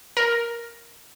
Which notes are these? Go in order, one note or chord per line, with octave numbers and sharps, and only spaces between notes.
A#4